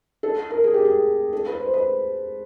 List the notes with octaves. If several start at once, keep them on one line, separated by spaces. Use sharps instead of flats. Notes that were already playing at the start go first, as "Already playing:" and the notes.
A4
A#4
G#4
G4
G#4
A4
B4
C5
B4